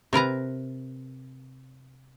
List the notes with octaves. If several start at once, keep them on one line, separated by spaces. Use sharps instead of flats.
C3 A#4 B4 A#5